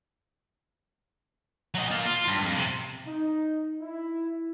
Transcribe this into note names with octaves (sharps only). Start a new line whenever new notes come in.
F#3 D#5
A#3 F4
F4
G2
F2
C3
D#4
E4